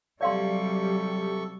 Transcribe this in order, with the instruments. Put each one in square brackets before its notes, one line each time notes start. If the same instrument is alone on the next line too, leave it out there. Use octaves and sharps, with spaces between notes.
[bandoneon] C3 A4 C#6 [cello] F#3 G3 [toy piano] D5 F5 C6